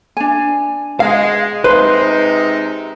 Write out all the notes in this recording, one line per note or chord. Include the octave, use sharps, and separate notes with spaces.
D4 G#5
G#3 F5
C3 G#3 D#4 B4 C5